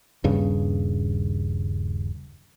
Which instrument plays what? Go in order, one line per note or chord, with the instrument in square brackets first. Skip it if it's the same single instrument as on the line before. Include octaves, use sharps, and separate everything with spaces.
[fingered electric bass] D#1 G2 C#3